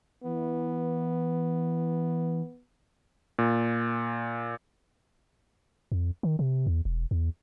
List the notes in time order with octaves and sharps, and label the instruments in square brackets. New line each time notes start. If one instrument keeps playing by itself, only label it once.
[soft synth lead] E3 [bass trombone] B3
[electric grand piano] A#2
[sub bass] F2
D#3
C3
E2
E1
E2